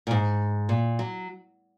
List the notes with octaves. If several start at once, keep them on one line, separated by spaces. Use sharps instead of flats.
A#2
G#2
A#2
F#3